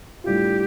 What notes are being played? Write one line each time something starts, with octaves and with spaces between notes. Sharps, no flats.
A2 G3 D4 F4 G4